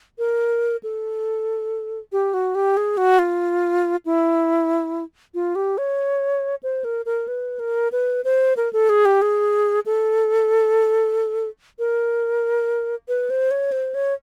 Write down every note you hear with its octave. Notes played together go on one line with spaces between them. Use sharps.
A#4
A4
G4
F#4
G4
G#4
F#4
F4
E4
F4
G4
C#5
C5
A#4
A#4
B4
A#4
B4
C5
A#4
A4
G#4
G4
G#4
A4
A#4
B4
C5
C#5
C5
C#5